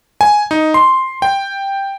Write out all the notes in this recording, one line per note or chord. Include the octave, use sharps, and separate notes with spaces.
G#5
D#4
C6
G5